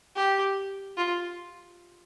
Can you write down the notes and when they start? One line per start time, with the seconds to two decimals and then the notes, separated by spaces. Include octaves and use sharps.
0.16 G4
0.97 F4